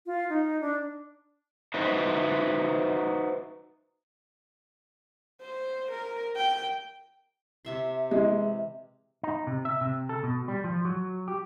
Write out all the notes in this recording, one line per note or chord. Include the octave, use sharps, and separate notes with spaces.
F4
D#4
D4
D#4 F#4 B4 C5 D#5 E5
C5
A#4
G5
C3 E5 C6
E3 G#3
D#4
C3
E5
C3
A4
B2
G3
F3
F#3
G4